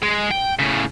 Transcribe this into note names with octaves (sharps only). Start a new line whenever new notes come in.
G#3
G5
A2 C#3